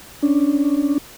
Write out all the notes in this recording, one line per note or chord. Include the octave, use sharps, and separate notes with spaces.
C#4 D4